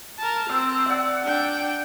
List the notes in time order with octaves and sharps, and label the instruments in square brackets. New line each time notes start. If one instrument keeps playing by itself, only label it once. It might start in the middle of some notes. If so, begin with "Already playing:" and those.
[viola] A#4 A5
[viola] C4 [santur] E6
[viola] D5 [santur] E5 F#5
[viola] D4 G5